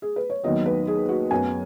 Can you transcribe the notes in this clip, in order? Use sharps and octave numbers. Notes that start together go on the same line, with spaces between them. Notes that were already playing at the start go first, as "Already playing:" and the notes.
G#4
B4
C#5
D#2 D#3 F#3 B3 D#5
B4
G#4
F#4
F#2 F#3 B3 G#5